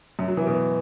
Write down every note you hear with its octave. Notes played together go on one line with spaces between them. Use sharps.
F#2
F#3
E3
B2